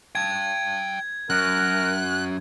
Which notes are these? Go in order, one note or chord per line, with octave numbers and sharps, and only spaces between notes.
G5 A5 G#6
F#2 A#4 F#6